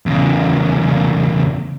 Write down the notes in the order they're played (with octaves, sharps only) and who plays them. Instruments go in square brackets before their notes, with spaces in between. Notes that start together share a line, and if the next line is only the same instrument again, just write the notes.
[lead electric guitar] E2 C#3